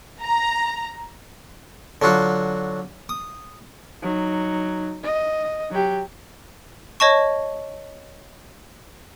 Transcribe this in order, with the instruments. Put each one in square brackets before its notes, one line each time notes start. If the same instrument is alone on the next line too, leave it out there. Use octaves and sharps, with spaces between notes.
[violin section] A#5
[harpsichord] D3 F#3 F4 F#4
D#6
[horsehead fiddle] F#3 D#4
D#5
F#3 G4
[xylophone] C#5 D#5 A5 C#6